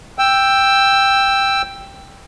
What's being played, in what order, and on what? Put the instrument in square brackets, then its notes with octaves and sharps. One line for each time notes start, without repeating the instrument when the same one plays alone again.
[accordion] G5 E6